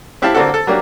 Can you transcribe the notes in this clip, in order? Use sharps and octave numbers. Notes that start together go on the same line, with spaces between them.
C4 E4 G4 F5 A5
D3 A#3 C4 D4 F#4 A4
A4
F#3 A#3 D4 G4